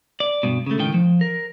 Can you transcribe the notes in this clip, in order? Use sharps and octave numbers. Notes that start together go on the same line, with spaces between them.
D5
G2 B2
C#3 A3
C#2 A2 D#3 G5
F3
A#4